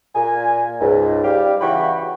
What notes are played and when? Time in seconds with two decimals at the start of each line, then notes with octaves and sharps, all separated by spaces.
0.15 A#2 G#5
0.81 C#2 G#2
1.24 G3 G4 F5
1.61 C#3 E3 F#4 G5 B5 C#6